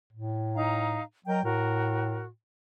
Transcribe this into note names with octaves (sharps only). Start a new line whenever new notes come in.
A2
D#4 F5 A#5
F#3 A#4 D#5 G5
A2 F#4 A#4